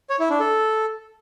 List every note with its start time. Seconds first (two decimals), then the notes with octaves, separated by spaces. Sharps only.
0.10 C#5
0.20 E4
0.30 D4
0.40 A4